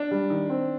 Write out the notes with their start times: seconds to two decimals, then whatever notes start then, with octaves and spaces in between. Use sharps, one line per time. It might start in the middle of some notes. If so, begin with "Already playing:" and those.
Already playing: D4
0.11 G3
0.30 D#3
0.50 C4